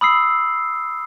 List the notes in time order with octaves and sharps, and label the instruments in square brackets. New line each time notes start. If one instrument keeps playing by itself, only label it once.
[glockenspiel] B5 D#6 E6 C7